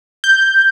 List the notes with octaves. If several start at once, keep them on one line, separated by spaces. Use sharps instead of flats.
G6